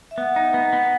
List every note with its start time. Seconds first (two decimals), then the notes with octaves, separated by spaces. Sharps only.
0.11 E5
0.18 B3 F#5
0.36 D#4
0.54 B3
0.73 B3